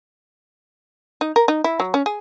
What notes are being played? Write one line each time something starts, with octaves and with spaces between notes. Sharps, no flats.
D#4
A#4
D#4
E4
F#3
C#4
G#4